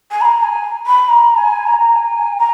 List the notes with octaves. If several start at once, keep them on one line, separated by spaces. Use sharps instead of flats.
G#5
B5
A#5
G#5
B5
A#5
G#5
A#5
G#5
A#5